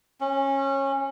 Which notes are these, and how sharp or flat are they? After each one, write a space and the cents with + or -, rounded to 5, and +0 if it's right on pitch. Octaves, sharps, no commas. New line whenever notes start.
C#4 -20